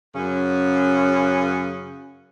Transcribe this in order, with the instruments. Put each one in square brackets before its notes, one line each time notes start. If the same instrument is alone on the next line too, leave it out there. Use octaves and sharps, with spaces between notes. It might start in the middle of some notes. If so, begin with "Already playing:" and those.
[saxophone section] F#2 C#3 C#4